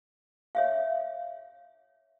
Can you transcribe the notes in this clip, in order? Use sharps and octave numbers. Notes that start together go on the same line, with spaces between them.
C#5 E5 F5